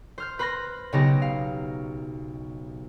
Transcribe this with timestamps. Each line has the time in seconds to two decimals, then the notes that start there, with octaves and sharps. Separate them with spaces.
0.18 C5 F6 G6
0.39 B4 C5 B5 C6 A#6
0.92 B1 C#3 B3 D#4 G4 A#6
1.22 F5